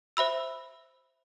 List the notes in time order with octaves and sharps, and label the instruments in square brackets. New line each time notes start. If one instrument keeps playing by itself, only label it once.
[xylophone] C5 E5 B5 E6